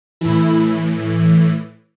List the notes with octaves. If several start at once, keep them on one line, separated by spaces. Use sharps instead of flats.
A2 E3 E4